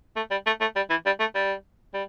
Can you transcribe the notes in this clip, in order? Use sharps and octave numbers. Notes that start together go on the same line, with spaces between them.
A3
G3
A3
A3
G3
E3
G3
A3
G3
G3